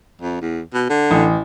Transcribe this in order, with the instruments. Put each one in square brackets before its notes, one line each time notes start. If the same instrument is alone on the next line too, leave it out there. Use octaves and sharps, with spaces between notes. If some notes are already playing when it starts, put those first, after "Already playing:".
[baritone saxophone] F2
E2
B2
D3
[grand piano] A1